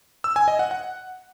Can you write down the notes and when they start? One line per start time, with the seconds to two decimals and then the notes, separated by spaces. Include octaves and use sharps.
0.24 E6
0.36 G#5
0.48 D#5
0.59 F#5
0.71 F#5